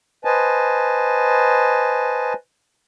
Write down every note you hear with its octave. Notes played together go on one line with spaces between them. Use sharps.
B4 C5 D#5 G#5 A5